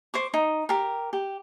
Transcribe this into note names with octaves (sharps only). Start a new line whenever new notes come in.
C5 C#6 D6
D#4
G4 A#4
G4